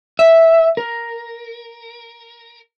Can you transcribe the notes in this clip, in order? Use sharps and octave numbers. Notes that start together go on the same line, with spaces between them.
E5
A#4